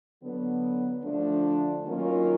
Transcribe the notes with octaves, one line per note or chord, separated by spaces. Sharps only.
D3 F#3 B3
D3 F3 A3 D4
D#3 F#3 A#3 C#4 F4